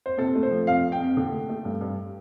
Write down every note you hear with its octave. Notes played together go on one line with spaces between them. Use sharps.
C5
C3 A4
A3
C5
F3
F2 F5
F2
G5
F2
D3
A3
A3
G2
G2